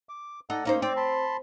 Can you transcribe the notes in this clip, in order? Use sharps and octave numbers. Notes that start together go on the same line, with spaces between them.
D6
D#4 A4 D5 F#5
A#3 C#4 D#4 C5
C4 C5 D5 D6
A5 B5 C6